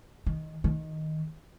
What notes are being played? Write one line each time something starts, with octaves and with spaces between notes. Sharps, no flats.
D#3
D#3